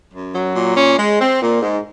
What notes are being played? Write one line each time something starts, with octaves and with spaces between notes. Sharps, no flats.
F#2
F#3
A#2
C#4
G#3
C4
A#2
G#2